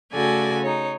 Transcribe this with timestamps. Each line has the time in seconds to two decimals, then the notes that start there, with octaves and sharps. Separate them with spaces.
0.13 C#3 A3 F#4 A4 D5 G#5
0.61 D#4 C#5